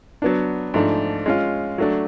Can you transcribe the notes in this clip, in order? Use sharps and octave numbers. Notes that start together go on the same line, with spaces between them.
F#3 B3 D4
G#2 F3 A3 D4
G#3 C#4 F4
F#3 A3 D4